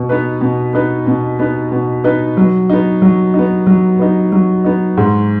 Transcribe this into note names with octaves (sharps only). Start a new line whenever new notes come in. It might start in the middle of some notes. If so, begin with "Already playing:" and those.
Already playing: B2
B3 D#4 B4
B2
B3 D#4 B4
B2
B3 D#4 B4
B2
B3 D#4 B4
F#3
B3 D#4
F#3
B3 D#4
F#3
B3 D#4
F#3
B3 D#4
G#2